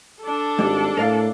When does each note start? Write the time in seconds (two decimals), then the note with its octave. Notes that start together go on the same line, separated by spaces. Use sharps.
0.21 D4 A4
0.59 G#1 G3
0.97 A2 A#4 D5 F5